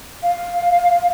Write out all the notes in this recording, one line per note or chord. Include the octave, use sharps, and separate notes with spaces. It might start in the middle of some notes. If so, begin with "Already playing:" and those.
F5